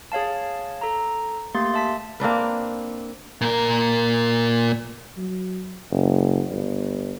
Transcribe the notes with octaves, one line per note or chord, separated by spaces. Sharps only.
G#4 C#5 F5 A5
A4 A#5
A3 A#3 G4 C6 A6
E5 A5 B6
A#3 C4 D4 B4
A#2 A#4
F#3
F#1
G1